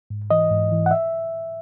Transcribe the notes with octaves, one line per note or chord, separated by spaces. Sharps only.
G#2
E3 D#5
G#2
E3
F#5
E5